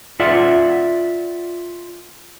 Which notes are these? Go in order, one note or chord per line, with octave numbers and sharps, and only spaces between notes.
F4 D5 E5 F#5